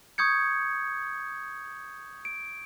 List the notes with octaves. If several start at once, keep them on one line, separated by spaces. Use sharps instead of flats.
C#6 D#6 G6 G#6 C#7
D7